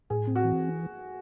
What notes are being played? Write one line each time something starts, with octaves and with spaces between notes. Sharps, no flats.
A2 G#4
C4
F#4
E3